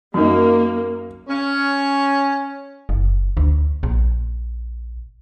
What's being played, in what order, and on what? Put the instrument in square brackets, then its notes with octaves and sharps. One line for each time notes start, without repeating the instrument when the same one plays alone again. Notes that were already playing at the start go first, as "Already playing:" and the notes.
[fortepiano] F#2 D#4 [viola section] A#3
[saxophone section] C#4
[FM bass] F#1
D2
A#1